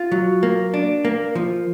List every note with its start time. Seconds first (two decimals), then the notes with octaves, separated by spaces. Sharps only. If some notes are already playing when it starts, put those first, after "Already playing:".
Already playing: F4
0.12 F#3
0.43 A#3
0.74 D4
1.05 A#3
1.35 F3